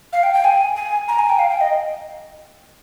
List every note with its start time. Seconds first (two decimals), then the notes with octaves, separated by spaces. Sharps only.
0.13 F5
0.23 G5
0.34 G5
0.44 G#5
0.76 G#5
1.08 A#5
1.19 G#5
1.29 G5
1.39 F5
1.51 G5
1.61 D#5